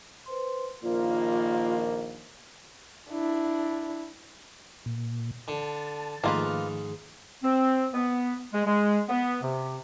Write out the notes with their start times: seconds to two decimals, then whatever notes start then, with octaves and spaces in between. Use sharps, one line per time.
0.26 B4 C5 C6
0.83 A#1 D#3 A#3 F4 A#4 C5 D5
3.10 D4 E4
4.86 A#2
5.48 D3 A5
6.24 G#2 D#3 F3 A3 A#3 F4 B4
7.44 C4
7.94 B3
8.54 G#3
8.66 G#3
9.09 B3
9.43 C3